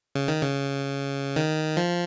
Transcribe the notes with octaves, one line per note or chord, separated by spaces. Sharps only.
C#3
D#3
C#3
D#3
F3